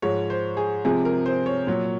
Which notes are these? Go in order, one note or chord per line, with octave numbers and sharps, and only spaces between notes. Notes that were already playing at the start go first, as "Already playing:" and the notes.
G#2 F3 G#3 C#5
C5
G#4
C3 F3 G#3 G#4
A#4
C5
C#5
A#2 F#3